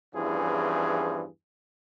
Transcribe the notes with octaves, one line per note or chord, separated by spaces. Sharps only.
E2 G2 E3 F3 C#4 G#4